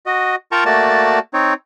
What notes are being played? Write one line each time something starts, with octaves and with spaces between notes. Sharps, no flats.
F#4 D#5
F4 A#4 G5 A5 A#5 C#6
A3 A#3 F#4 D5 A5
C4 D#4 C#5